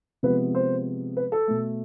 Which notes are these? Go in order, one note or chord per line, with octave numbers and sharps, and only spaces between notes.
C3 F3 G#3 B3 B4
C5
B4
A4
B2 A3